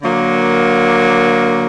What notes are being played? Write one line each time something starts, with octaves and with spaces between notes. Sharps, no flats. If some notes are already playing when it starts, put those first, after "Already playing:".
D3 F#3 A#3